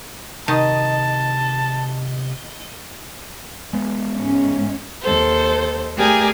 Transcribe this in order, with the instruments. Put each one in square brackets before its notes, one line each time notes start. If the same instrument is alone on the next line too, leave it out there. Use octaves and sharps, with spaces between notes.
[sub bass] C3 [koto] D#3 [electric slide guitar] D#5 [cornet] A5
[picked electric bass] G#3 B3
[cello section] G#2 C#4
[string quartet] D#2 A4 C5
A3 G4 G#4 A#4 D5 G#5